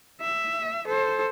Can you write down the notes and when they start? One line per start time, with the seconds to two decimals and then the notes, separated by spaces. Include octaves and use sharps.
0.21 E5
0.87 A4 C5